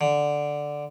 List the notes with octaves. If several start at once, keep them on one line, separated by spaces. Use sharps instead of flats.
D3